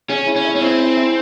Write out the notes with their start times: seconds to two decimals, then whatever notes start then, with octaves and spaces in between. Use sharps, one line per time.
0.09 C#4 G#4
0.27 E4
0.36 C#4
0.45 E5
0.56 C#4
0.61 C4 E4
0.80 E5
0.97 E4